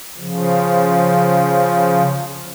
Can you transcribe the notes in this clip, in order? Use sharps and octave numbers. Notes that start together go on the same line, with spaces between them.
C#3 F3